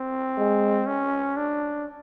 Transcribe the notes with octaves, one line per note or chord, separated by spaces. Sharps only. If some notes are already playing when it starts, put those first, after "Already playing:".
Already playing: C4
G#3
C#4
D4